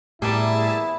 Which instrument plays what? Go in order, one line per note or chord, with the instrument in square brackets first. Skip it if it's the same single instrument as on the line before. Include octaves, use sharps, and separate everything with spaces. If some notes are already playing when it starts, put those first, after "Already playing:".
[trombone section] E2 E4 [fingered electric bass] A2 [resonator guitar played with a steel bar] G3 A#3 [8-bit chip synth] G#4 E5 A5